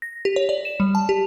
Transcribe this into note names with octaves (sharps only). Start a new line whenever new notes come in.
A#6
G4
C#5
D5
E7
G3
A5
G4